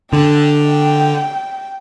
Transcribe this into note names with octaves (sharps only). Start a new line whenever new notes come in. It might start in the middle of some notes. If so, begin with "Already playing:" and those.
D3 G5